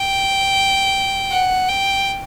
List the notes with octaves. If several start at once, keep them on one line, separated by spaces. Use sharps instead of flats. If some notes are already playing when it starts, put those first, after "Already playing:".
Already playing: G5
F#5
G5